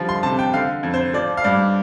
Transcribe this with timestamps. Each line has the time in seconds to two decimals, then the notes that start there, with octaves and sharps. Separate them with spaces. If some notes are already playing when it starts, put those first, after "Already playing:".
Already playing: D3 F3 G3
0.09 C6
0.23 C3 A5
0.39 G5
0.53 D3 F5
0.83 F2
0.94 C5
1.13 F3 D5
1.37 F5
1.44 G2 D5